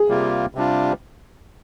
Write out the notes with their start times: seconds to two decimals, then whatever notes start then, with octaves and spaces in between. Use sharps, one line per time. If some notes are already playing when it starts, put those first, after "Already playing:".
Already playing: G#4
0.08 C3 G3 A#3 F4
0.55 C3 G3 D4 F4